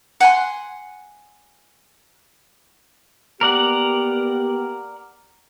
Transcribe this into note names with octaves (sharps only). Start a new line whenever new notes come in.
F#5 G#5 C6
A#3 B3 G4 A#4 D5 F#5